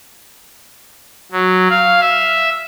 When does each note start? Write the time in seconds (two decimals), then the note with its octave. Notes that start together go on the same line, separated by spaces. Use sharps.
1.32 F#3
1.70 F5
2.01 E5